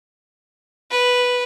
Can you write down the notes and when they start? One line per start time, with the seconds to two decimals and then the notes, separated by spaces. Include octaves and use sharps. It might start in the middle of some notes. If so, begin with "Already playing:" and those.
0.91 B4